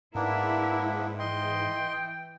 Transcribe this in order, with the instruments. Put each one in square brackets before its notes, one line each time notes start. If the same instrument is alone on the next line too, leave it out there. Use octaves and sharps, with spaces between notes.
[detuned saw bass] G#2 [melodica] A#3 B3 D4 [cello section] E4 [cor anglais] A#4
[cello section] E3 [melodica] D#5 C6 [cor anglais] G5